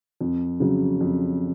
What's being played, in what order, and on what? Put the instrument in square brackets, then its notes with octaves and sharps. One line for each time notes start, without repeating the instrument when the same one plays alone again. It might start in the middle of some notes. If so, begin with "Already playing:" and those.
[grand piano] F2
C#3 F#3
F2